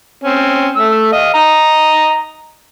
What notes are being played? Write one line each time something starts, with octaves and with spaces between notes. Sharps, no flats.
C4 C#4
A3 E6
D#5 F5
D#5 A#5